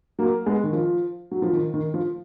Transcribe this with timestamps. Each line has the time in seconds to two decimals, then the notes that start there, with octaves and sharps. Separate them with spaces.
0.19 F#3 A#3
0.46 G#3 B3
0.64 D#3
0.73 F3
1.31 F#3
1.42 F3
1.53 D#3
1.74 D#3
1.94 F3